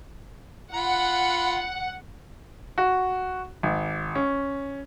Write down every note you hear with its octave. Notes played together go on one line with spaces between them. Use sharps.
F4 F#5 B5
F#4
G#1
C#4